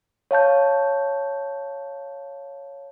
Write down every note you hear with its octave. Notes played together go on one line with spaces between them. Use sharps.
C#5 F5 A5 G6